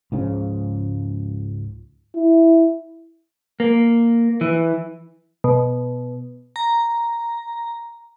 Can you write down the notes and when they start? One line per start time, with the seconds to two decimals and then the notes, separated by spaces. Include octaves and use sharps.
0.12 C#2 G#2 C#3 F3
2.16 E4
3.60 A#3
4.41 E3
5.44 B2
6.56 A#5